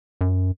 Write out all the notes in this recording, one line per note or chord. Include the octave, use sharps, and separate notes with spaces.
F#2